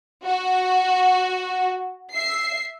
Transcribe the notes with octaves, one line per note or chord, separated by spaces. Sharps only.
F#4
E5 C7